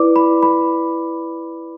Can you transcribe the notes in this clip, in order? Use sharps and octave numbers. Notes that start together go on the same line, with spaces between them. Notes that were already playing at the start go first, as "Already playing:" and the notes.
Already playing: E4 B4 D5 D6
B5
B5